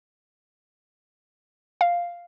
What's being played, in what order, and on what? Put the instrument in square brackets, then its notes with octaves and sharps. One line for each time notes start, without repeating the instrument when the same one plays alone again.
[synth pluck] F5